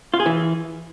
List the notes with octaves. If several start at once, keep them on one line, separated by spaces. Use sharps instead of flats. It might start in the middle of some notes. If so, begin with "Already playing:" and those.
F4
G#4
E3